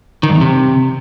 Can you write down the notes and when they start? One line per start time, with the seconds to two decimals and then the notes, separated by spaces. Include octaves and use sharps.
0.23 D#3
0.29 G2
0.35 E2
0.41 C3